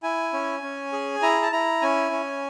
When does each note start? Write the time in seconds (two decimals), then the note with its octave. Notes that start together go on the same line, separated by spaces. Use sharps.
0.03 E4 G#5
0.33 C#4
0.63 C#4
0.93 G#4
1.22 E4 A#5
1.42 A5
1.52 E4 A#5
1.81 C#4 G#5
2.12 C#4